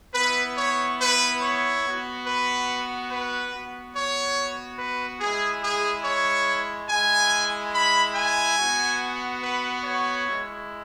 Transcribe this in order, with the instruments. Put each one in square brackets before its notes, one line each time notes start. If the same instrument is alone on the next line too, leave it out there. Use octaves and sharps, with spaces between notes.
[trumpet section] B3 E4 B4
C#5
B4
C#5
B3 F#4
B4
B4
B3 F#4
C#5
B4
G#3 E4 G#4
G#4
C#5
G#3 E4 G#5
B5
G#5
B3 F#4
B4
C#5
G#3 E4